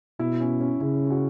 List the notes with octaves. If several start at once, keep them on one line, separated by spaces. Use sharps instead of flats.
B2 E4
C#4
C#4
C#3 E4
F#4